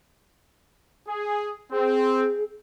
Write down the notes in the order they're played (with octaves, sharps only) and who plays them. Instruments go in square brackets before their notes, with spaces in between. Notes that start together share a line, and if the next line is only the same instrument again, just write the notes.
[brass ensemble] G#4
[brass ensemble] C4 [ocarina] G#4